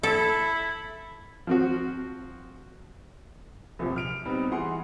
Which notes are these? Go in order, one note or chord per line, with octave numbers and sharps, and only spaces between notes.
E4 A4
F3 C4 F#4
A#1 C3 F3
F6 D7 F7
G3 B3 C4 D#4
E3 G#4 F#5 C6